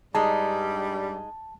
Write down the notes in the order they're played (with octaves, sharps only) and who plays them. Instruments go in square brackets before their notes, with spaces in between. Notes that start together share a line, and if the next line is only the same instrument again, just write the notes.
[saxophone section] G2 G3 [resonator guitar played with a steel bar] G#3 D#4 [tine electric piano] A5